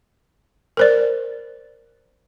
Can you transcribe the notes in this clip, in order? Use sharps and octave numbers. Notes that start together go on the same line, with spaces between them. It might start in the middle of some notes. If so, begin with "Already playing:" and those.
A#4 C5 D5